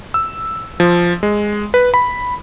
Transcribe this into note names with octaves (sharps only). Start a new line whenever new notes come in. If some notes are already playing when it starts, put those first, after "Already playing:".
E6
F3
G#3
B4
B5